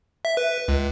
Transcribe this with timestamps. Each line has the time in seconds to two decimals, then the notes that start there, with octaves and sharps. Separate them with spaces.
0.25 E5
0.37 B4
0.68 C#2